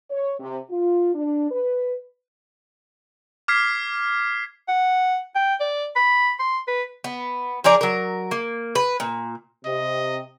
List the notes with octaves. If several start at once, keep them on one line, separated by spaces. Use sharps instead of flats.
C#5
C3
F4
D4
B4
D6 F6 G#6 B6 C7
F#5
G5
D5
B5
C6
B4
B3
F3 G#4 A#4 D5
F#3 A#4
A#3
B4
A#2
C3 D#5